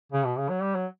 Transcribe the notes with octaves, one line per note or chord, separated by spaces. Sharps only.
C#3
B2
C#3
F#3
G3
F#3